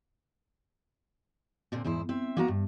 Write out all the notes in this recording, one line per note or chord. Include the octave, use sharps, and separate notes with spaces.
A#2 D3 C4
E2 G#2 E4 C5
C4 E5
A#3 B3 F#4 F#5 G5 A#5
G2